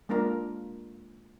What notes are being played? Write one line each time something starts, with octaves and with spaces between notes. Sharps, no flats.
G#3 A#3 D4 F4 A#4